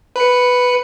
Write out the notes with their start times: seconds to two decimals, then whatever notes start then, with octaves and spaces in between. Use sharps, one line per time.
0.16 B4 C#7